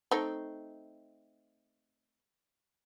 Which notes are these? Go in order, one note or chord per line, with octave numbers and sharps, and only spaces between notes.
A3 C4 D#4